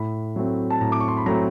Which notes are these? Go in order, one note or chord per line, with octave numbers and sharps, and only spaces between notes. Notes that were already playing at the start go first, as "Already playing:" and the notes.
Already playing: A2 B5
F#3 A3 C4
A5
A2 A#5
D6
C#6
C6
B5
F#3 A3 C4 A#5